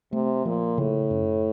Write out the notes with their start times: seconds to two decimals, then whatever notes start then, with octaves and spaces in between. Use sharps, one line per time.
0.12 C3 A3
0.45 A#2 F3
0.78 A2 C#3
1.10 F#2